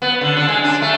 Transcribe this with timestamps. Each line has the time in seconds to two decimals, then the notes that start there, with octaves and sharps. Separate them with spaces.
0.02 B3
0.21 D3
0.37 D3
0.49 G#3
0.64 D4
0.82 A3